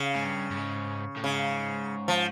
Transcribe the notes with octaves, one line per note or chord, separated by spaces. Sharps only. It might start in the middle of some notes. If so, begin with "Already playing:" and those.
Already playing: C#3
G#2
G2
G2
G#2
A2
G#2 C#3
F3